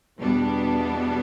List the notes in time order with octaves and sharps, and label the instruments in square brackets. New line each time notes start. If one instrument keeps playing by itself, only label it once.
[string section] E2 B2 G3 B3 D4